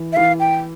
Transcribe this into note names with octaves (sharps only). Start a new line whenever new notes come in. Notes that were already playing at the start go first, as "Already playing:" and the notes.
Already playing: E3
E5
E3 F5
G5